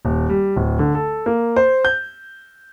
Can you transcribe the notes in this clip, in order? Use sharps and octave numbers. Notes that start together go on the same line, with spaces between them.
D#1
G3
D1
D3
A4
A#3
C5
G6